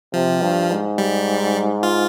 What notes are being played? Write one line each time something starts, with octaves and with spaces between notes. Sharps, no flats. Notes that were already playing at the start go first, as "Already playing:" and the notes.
C3 F3
G2
G#2
G3
F4